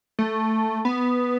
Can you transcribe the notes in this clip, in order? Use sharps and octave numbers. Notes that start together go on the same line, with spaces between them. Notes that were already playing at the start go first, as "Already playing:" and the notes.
A3
B3